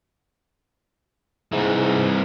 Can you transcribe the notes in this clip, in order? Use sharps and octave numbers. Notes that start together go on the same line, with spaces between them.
C2 G#2 E3